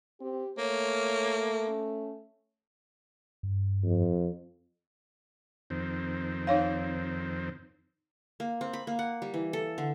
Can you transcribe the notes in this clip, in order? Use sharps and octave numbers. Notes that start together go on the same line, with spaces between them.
C4 G4
A3 A#3 C#5
C#4
G2
F2
F2 D#3 C4
D#4 C#5 F5
A#3
C4
B5
A#3
F#5
G3
E3
A4
D3